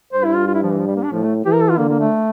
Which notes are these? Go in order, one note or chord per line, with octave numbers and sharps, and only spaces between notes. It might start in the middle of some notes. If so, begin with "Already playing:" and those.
G2 C5
E4
F4
F4
E4
F3
E3
F3
G3
A#3
D4
A2 F3
A3
E3 G4
A#4
A4
F4
D3 A#3
A#3
A3